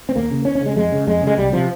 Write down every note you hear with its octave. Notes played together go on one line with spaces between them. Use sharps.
C4
D#2 A#3
C#3
D#2 C#4
C#4
C#3 G#3
F2 G#3
C#3
F2 G#3
C#3
G#3
C2 G3
C3 F3